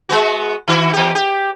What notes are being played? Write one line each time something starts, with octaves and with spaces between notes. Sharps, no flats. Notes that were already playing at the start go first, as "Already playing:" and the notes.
G#3 B3 F#4
D#3 E4 F#4
E2 G4
G4